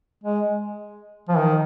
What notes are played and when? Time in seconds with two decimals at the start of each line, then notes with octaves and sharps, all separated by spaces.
0.24 G#3
1.29 F3
1.37 D#3